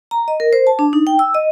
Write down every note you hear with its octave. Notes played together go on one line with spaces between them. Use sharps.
A#5
D#5
A#4
C5
A5
D4
D#4
G5
E6
D#5